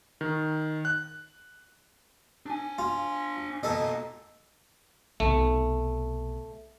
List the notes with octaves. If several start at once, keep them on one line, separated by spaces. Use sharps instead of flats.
D#3
F#6
D4 G#5
F4
B2 A#3 A4 D#5
B1 C3 A3